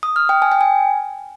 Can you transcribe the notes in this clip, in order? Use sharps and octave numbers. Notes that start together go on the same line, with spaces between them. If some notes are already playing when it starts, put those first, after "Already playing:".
D#6
F6
G5
G#5
G5
G#5